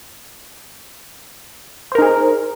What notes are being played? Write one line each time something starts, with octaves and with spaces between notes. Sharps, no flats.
D#4 G#4 A#4 C5